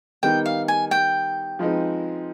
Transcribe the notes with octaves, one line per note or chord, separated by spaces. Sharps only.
D#3 G3 B3 D#4 G5
F5
G#5
G5
F3 G#3 C4 D#4 B4